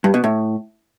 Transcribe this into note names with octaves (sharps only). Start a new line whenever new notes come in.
G2
B2
A2